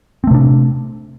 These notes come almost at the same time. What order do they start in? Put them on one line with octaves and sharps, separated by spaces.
C4 A3 C3 D4